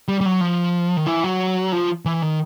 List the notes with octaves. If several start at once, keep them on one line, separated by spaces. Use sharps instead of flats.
G3
G3
F#3
F3
D#3
E3
F#3
F3
E3
D#3